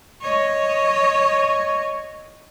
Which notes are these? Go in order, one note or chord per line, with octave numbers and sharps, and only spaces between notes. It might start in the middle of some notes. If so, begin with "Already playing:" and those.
C#5 D#5